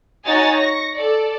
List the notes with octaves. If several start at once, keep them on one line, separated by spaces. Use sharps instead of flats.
D#4 F#4 C#5 D#5 G#5 A6
C#6 A#6 C#7
A4 D5